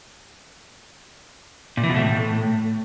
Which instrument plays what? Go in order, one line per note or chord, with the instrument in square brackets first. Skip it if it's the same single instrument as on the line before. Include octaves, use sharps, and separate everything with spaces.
[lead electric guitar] A#2
E3
B2
A3
A2